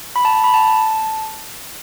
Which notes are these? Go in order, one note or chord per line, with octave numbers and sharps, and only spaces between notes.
B5
A5
A5
B5
A5